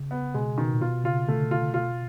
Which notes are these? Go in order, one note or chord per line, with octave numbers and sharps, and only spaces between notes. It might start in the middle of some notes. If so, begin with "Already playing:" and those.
Already playing: C#3
B3
B2 G#3
B2 D#3
A#2
B2 F4
C#3 F4
D3 A3
F4
B2 F4